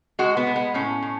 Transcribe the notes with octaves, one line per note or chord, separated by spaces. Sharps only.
G#3 F#4
B3
G#3
B3
A2 C#4
A2